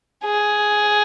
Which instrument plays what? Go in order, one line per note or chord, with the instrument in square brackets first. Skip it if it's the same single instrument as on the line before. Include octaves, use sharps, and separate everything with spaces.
[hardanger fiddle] G#4